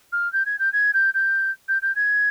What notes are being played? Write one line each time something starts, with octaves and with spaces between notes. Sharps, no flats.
F6
G6
G#6
G6
G#6
G6
G6
G6
G6
G#6